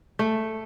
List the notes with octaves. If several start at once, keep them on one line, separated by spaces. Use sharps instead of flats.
A3